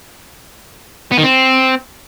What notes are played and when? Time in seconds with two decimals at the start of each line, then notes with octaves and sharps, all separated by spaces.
1.12 B3
1.18 D#3
1.23 C4